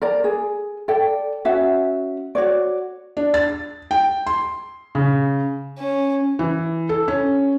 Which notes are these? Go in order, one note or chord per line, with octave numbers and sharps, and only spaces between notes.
A#4 D5 A#5
G#4
A4 D5 G5
C#4 F#4 E5 F#5
F#4 C#5 D5
D4
A6
G5
C6
C#3
C#4
E3
A4
C#4